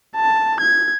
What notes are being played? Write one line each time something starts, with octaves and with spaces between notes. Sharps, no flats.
A5
G#6